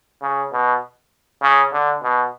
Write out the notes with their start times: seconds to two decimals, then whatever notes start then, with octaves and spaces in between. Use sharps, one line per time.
0.22 C#3
0.52 B2
1.42 C#3
1.72 D3
2.02 B2